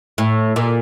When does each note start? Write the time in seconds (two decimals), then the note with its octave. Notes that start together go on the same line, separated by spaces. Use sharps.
0.18 A2
0.56 A#2